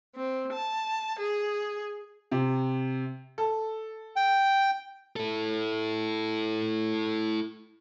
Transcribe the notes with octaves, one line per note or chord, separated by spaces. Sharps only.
C4
A5
G#4
C3
A4
G5
E4 A4